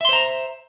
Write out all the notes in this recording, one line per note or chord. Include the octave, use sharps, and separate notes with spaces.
C5 E5 A#5 C6